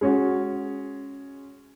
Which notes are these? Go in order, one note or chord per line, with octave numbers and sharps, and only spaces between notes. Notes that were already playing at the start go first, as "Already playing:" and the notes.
G#3 C#4 F#4